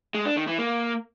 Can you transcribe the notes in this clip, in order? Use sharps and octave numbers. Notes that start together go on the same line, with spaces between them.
G#3
D4
D#3
E3
A#3